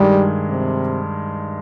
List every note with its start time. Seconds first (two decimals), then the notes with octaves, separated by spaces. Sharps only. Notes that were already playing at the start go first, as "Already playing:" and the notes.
Already playing: G2 D#3 G3 G#3
0.49 C3